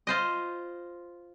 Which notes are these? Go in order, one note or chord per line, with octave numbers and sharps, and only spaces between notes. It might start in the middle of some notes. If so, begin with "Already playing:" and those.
F4 C5 D#5